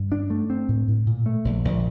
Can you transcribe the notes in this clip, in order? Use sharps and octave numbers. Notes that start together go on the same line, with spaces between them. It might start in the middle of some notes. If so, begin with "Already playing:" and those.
Already playing: G2
D4
A3
C4
A2
A2
A#2
A3
A#1
A#1